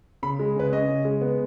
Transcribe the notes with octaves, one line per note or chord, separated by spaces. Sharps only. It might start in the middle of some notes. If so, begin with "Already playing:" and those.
C#3 B5
G#3
C#3 B4
C#4 D#5
C#3
G#3
B3